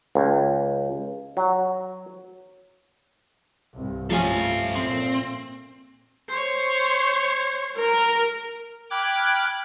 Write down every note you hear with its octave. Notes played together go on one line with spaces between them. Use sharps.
C#2
F#3
C2 G2
G2 F3 A3 C#4 A4 F5
A#2 C4
C5 C#5
A#4
G5 B5 D6 F6 F#6 G#6